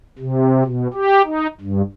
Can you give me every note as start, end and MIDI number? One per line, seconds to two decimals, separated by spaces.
0.18 0.63 48
0.65 0.88 47
0.94 1.22 67
1.25 1.47 63
1.61 1.82 43